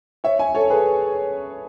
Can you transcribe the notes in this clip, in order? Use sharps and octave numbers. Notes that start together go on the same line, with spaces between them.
C#5 E5
E5 G#5
A4 C#5
G#4 B4